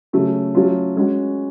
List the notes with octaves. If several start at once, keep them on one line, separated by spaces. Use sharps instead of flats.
C#3 F#3 A3 C#4
F#3 A3 C#4 F4
G#3 C#4 F#4